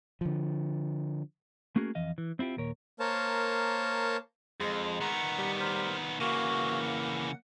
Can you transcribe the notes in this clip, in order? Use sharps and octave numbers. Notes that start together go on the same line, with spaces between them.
D3 F3
A3 A#3 C#4 F#4 G#4 A#4
F2 E3 D#5 F5
E3
C4 E4 F4 G4
D#2 A#2 A#4 C#5
A#3 A#4 C5 C#5 A5
F2 G#3
D#3 B3 F#5 A#5
G3
A#4 C5
C#3 E3 A#3 F#4
F#5